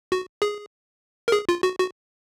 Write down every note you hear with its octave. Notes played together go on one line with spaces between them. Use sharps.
F#4
G#4
A#4
G#4
F4
F#4
F#4